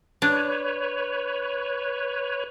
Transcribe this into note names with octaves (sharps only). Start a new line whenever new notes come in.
D4 B4 C#5